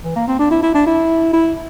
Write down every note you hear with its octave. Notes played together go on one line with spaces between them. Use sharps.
E3
A#3
C4
D4
E4
E4
D4
E4
E4